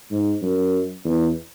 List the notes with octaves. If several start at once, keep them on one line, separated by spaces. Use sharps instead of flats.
G#2
F#2
E2